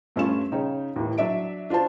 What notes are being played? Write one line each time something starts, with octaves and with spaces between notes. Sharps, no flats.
G2 A3 C#4 F4 G#5 E7
C#3 D#4 C#5 G5
D#2 A2 E3
F#3 D4 D5 E5 D7
D4 F4 F#4 C5 A5